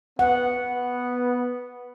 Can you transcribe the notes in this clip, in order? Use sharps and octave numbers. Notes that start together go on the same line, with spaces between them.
B3 F#5